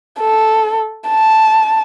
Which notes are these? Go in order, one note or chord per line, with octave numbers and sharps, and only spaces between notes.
A4
A5